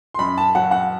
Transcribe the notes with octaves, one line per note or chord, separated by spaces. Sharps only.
C6
F#2 B5
A5
F#3 F#5
F#5